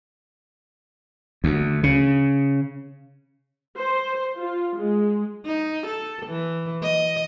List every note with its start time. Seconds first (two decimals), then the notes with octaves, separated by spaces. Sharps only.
1.44 D2
1.83 C#3
3.76 C5
4.38 F4
4.79 G#3
5.46 D#4
5.87 A4
6.26 E3
6.83 D#5